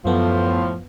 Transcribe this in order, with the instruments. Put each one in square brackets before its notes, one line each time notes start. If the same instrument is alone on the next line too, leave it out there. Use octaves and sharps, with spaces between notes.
[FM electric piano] F#2 B3 [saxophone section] A2 F3